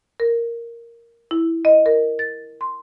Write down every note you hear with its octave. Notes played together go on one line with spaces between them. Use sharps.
A#4
E4
D#5
A#4
A6
C6